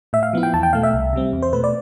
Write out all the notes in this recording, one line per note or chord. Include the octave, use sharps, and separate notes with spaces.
A2 E5
F5
F3 B3 E4
G5
E2 A5
G5
B2 A3 F5
E5
C2
C3 G3 C4
E2
C5
B2 A3 B4
D5